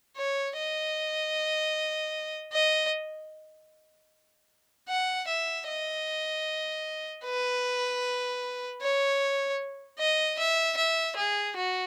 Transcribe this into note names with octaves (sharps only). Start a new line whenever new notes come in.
C#5
D#5
D#5
F#5
E5
D#5
B4
C#5
D#5
E5
E5
G#4
F#4